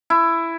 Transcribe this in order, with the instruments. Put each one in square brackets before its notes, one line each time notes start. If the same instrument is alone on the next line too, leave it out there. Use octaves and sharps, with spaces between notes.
[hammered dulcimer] E4